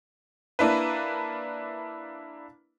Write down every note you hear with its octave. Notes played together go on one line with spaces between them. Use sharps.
A#3 D4 E4 B4